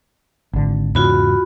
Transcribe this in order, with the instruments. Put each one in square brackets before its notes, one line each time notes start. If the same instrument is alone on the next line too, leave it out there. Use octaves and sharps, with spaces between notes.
[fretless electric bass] G#1 D3
[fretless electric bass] E2 G#2 C#3 [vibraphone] F4 F#4 B5